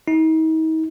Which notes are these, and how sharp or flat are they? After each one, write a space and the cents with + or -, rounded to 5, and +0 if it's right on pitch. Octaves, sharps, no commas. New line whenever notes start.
D#4 +40